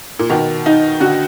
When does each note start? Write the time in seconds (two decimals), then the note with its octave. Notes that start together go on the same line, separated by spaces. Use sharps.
0.19 A#2
0.30 B2 D#3
0.66 D#4
1.00 D3 F#4